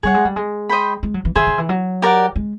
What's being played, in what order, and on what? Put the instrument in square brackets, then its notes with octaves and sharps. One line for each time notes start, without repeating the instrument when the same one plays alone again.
[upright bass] G3 [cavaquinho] G#4 C#5 F#5
[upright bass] G#3
G3
G#3
[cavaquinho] C5 D#5 G5 B5
[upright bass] G#3
F#3
E3
[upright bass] D#3 [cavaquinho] G#4 C5 E5
[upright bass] D#3
E3
F#3
[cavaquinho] G4 A#4 D5 F#5
[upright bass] G#3